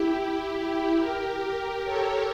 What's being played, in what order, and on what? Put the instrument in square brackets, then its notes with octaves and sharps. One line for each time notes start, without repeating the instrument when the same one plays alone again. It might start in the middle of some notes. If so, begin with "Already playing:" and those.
Already playing: [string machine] E4 G4
G4 A#4
G4 A#4
A4 C#5